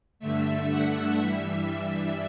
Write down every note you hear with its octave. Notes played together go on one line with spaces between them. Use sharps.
G2 D3 A3 E5
F#5
G2 E3 G3 E5